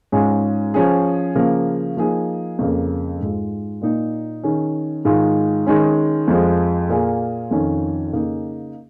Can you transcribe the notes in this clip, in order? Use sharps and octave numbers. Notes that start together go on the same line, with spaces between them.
G#2 G#3 C#4 F4 G#4
F3 C#4 G#4
C#3 F3 A#3
F3 A#3 D#4 G#4
F2 C#3 A#3
G#2 G#3 F4
A#2 A#3 D#4
D#3 C#4 G#4
G#2 D#3 G#3 F4
D#3 G#3 C#4
F2 F3 G#3
A#2 A#3 F4 G#4
F2 D#3 C#4 F4
C#3 A#3 D#4 G#4